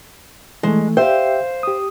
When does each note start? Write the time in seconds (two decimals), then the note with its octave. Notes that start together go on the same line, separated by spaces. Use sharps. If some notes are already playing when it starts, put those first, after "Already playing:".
0.63 E3 G#3 A3
0.97 G4 C5 E5 F5 G5
1.63 G4 D#6